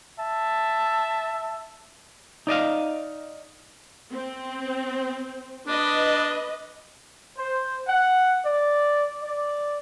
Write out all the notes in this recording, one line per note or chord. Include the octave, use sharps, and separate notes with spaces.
E5 A5
D#4 D5 D#5 F5
C4
D4 B4 D#5
C5
F#5
D5
D5